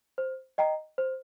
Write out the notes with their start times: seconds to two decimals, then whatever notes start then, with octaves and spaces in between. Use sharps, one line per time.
0.18 C5
0.58 D#5 G5 A#5
0.98 C5